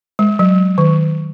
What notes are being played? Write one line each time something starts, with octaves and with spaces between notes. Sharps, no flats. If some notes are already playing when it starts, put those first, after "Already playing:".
G#3
F#3
D#3